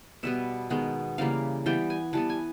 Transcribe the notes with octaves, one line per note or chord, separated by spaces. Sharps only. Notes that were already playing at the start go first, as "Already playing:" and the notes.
B2 G3 B3 E5
D#3 G#3 B3
C#3 E3 G3 A#3 F5
E3 G3 B3 G5
G#5
E3 G3 B3 A5
G#5